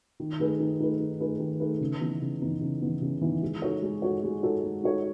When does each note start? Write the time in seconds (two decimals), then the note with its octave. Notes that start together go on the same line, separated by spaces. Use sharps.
0.20 D#3
0.39 A3 D#4 G#4 B4
0.60 D#3
0.79 A3 D#4 G#4 B4
1.00 D#3
1.20 A3 D#4 G#4 B4
1.40 D#3
1.60 A3 D#4 G#4 B4
1.80 C#3
2.00 E3 B3 D#4
2.21 C#3
2.42 E3 B3 D#4
2.61 C#3
2.82 E3 B3 D#4
3.02 C#3
3.21 E3 B3 D#4
3.42 G#3
3.62 D#4 F#4 A4 C#5
3.82 G#3
4.02 D#4 F#4 A4 C#5
4.23 G#3
4.43 D#4 F#4 A4 C#5
4.64 G#3
4.83 D#4 F#4 A4 C#5